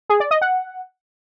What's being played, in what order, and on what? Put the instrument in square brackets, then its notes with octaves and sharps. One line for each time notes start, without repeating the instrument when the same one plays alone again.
[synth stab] G#4
D5
D#5
F#5